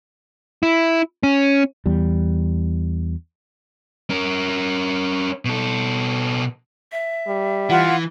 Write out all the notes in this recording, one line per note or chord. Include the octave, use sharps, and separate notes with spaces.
E4
C#4
E2 G3
C#4 A#4
B2 A4
E5
G3
E3 F4 F#5